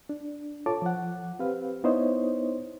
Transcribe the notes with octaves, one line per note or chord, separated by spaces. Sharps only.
D4
F4 A4 C#5 A5 D6
F3 F#5
C4 G4 B4 F5
B3 D#4 E4 C5 C#5 D#5